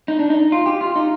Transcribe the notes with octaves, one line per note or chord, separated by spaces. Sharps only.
D#4
D4
D#4
F4
G4
F4
D#4